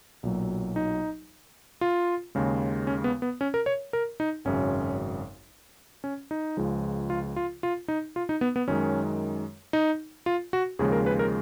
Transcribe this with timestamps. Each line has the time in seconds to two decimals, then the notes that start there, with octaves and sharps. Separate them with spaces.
0.23 B1 A#2 F#3
0.76 D#4
1.81 F4
2.35 D#2 C#3 G#3
2.87 C#4
3.04 B3
3.22 B3
3.41 C#4
3.54 A#4
3.66 C#5
3.93 A#4
4.20 D#4
4.45 G#1 F#2 C#3 C#4
6.04 C#4
6.31 D#4
6.57 C#2 C#3 F3 G#3
7.10 F4
7.36 F4
7.63 F4
7.88 D#4
8.16 F4
8.29 D#4
8.41 B3
8.56 B3
8.68 F#2 D#3 G#3 C#4
9.73 D#4
10.26 F4
10.53 F#4
10.79 D#2 C#3 F3 G#3 G#4
10.92 A#4
11.06 B4
11.19 A#4